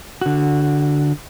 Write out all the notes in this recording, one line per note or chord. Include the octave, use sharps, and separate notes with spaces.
D3 F#4